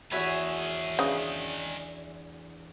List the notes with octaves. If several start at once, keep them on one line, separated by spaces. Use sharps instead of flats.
E2 D#3 F#4 G#4 C#5 E5 B5
C#3 D4